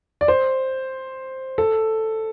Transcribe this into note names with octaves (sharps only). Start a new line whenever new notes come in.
D5
C5
A4